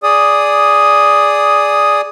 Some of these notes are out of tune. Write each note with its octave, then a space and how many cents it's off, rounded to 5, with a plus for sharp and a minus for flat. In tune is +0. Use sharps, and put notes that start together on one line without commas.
G#4 +0 D5 +0 D#6 +0